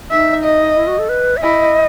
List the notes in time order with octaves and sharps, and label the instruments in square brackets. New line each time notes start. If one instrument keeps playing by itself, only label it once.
[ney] D#4 [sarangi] E5
[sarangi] D#5
[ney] E4
F#4
A4
B4
E5
[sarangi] E4 [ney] D#5